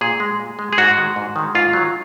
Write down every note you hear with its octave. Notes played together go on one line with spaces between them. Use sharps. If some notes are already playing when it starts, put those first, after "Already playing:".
A#2 G#4
G#3
A#2
G#3
G#4
G#2 F#4
D#3 G#3
G#2
D#3 G#3
G#2 F4
D#3 F#3